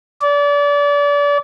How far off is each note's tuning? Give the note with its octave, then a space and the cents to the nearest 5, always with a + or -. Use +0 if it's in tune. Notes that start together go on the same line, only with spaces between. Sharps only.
D5 -30